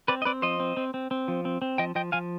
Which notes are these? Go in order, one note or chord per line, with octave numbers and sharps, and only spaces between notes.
C4 B4 D5
D#5
C4 B4 D5
F3 C5 D#5
C4
C4
C4
C4
F3
C4
C4
F3 D#5 G5
F3 D#5 G5
F3 F5 G#5